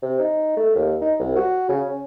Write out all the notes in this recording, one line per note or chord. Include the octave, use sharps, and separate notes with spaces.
C3
D#4
A3
D#2
D#4
C2
F#4
C#3
C#4